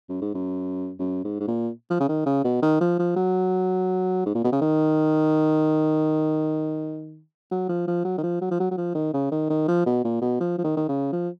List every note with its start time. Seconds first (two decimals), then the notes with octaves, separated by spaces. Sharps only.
0.09 F#2
0.22 G#2
0.34 F#2
0.99 F#2
1.24 G#2
1.40 G#2
1.48 A#2
1.90 F3
2.00 C#3
2.08 D#3
2.26 C#3
2.44 B2
2.62 D#3
2.81 F3
2.99 F3
3.16 F#3
4.26 G#2
4.35 A#2
4.44 B2
4.52 C#3
4.61 D#3
7.51 F#3
7.69 F3
7.88 F3
8.05 F#3
8.18 D#3
8.23 F3
8.41 F#3
8.51 F3
8.60 F#3
8.71 F#3
8.78 F3
8.95 D#3
9.14 C#3
9.32 D#3
9.50 D#3
9.68 F3
9.86 B2
10.04 A#2
10.21 B2
10.40 F3
10.58 F3
10.64 D#3
10.77 D#3
10.89 C#3
11.13 F3